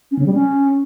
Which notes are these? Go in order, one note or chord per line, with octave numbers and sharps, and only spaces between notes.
C#4
C#3
G3
C#4